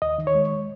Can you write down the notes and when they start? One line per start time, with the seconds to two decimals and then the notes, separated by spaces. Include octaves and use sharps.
0.02 D#2 D#5
0.18 D#3
0.27 C#5
0.35 G#3